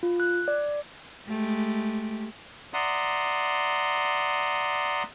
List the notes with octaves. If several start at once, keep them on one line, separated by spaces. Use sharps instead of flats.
F4
F#6
D5
G#3 A3 G4
D5 E5 F#5 A#5 C6 D#6